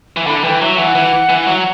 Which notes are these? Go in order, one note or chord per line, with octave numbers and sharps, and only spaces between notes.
E3
D3 B5
E3 G5
F#3 E5
E3 F#5
E3
E3
F#3